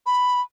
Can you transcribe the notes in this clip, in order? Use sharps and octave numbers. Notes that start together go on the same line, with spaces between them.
B5